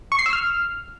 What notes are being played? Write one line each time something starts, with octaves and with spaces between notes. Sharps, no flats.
C#6
C7
E6
F6